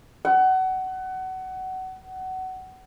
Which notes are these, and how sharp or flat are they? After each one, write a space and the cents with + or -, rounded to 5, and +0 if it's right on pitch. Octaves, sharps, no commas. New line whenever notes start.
F#5 +25